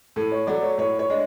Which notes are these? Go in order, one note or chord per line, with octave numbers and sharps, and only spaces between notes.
A2 A4
C#5
F#3 A3 D5
C#5
A2 C#5
C#5
G#3 D4